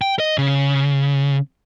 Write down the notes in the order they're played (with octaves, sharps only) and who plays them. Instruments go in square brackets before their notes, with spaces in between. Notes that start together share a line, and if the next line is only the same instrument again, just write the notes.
[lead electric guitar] G5
D#5
C#3